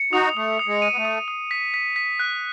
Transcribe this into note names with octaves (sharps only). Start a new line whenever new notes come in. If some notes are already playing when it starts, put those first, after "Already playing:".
Already playing: C#7
D#4 F#4 D#6
A3 D#6
D#6
G#3
D#7
B3
A3
D#6
D#6
B6
B6
B6
F#6